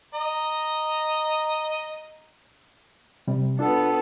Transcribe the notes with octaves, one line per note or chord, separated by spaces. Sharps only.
D#5 A#5
C3 G3
B3 D4 F4 A4